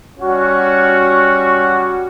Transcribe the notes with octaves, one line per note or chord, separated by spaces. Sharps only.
G3 C#4 F#4